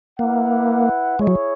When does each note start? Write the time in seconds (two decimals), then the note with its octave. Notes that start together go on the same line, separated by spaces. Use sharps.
0.19 A#3 E4 B4 F#5
1.19 G#3 E4 G#4 C#5
1.27 F#3